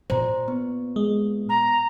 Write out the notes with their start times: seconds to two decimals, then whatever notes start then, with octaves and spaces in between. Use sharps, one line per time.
0.10 A#2 C5 A#5
0.48 B3
0.96 G#3
1.49 A#5